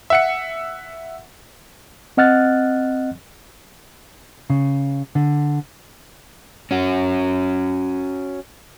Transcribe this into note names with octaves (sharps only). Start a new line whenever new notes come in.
E5 F#5 C#7
C4 D#5 F#5 F6 F#6 A6
C#3
D3
C#4 F#4